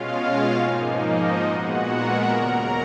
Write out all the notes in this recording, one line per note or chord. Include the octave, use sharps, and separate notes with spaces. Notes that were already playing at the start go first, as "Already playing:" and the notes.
Already playing: B2 G#3 C#4 F4 F5
G#2 F3 A#3 D#4
D#4 D#5
A#2 G#3 B3 F#4 F#5
A#4 A#5
D#2 C#3 F#3 A#4 A#5